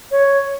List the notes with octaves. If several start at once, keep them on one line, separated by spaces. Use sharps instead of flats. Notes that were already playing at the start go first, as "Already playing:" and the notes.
C#5